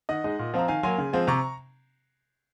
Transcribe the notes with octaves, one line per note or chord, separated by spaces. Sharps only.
D#3 D#5 F#5
G#3 D#4
A#2
F3 C4 F4 A#5
D#3 F5 G#5
F#3 A#3 G#5 C6
C#3
F3 G#3 C4
C3 A#5 C#6